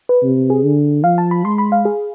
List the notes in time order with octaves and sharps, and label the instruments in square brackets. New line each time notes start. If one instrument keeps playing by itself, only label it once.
[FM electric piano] B4
[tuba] C3
[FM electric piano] G#4
[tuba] D3
[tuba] F3 [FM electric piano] F5
[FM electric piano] A5
B5
[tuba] G#3 [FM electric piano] C6
[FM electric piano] B5
F5
G#4